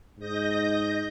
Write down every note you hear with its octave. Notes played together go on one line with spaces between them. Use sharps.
G#2 D#5 G6 A#6